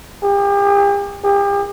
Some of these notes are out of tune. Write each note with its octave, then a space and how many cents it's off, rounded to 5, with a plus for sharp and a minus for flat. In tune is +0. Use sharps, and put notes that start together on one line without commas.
G4 +40
G4 +40